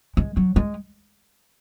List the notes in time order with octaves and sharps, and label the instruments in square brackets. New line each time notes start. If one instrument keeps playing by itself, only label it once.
[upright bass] G#3
F#3
G#3